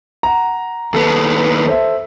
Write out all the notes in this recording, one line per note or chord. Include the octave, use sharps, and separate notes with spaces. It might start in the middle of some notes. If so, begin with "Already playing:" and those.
F#5 A#5
D#2 B3 A4
A4 C5 E5